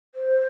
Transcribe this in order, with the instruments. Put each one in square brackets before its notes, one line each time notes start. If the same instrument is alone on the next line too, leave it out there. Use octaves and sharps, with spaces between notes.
[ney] C5